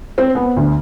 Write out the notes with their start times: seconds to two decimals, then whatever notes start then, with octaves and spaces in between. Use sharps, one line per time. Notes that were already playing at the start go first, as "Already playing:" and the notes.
0.18 C4
0.35 B3
0.56 D2